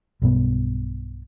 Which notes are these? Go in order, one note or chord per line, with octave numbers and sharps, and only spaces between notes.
B1 G2 B2 B3